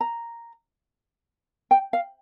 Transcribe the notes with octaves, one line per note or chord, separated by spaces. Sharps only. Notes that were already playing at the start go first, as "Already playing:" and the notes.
A#5
G5
F5